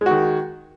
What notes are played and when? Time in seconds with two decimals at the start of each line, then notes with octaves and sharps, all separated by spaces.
0.01 G#3
0.06 F#4
0.11 D#3